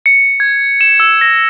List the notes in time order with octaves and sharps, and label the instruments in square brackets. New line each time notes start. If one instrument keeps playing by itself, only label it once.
[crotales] C#7
G#6
E7
E6
A#6